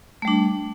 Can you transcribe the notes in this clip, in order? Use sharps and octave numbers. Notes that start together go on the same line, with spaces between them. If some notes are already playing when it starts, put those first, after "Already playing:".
G3 A3 D4